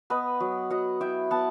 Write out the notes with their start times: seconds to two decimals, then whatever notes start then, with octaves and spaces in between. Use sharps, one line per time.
0.10 B3 B4 D#5
0.40 F#3
0.70 F#3 D#5 F#5
1.01 E4 E5 G5
1.31 B3 F#5 A5